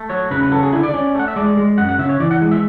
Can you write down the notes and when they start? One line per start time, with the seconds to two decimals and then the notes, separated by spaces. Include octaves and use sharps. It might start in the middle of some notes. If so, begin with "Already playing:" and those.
Already playing: A3
0.10 F#3 C#5
0.31 C#3 B4
0.43 B4
0.52 F#3 A4
0.63 G#4
0.73 D3 E4
0.83 D5
0.94 C#4
1.15 A3 F#5
1.28 E5
1.36 G#3 D5
1.57 G#3
1.78 F#2 F#5
1.89 F#5
1.99 C#3 E5
2.09 C#5
2.20 E3 D5
2.31 F#5
2.41 G#3
2.51 E5